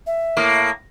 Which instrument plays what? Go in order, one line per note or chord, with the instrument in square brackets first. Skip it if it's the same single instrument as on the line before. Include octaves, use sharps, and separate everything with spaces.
[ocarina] E5
[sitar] A2 A#3